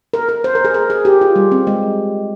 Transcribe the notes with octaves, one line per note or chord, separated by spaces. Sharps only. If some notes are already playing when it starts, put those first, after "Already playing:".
A#4
A#4
C5
A#4
G#4
A#4
G#4
G4
F4
G3
C4
G#3